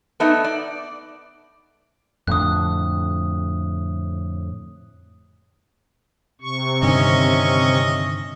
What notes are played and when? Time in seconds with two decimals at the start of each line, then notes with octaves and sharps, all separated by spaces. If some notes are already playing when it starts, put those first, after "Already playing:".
0.20 A3 B3 D4 D#4 E5
0.44 D5
2.27 F2 A2 D3 D#6 F#6
6.41 C3 C#6
6.82 G2 D3 D#3 C#4 D#5 E5